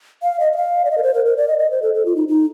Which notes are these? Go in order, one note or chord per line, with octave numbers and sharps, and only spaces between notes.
F5
D#5
D#5
F5
D5
D#5
A#4
C5
A#4
A#4
D5
D#5
D#5
C5
A4
A4
F4
D#4
D#4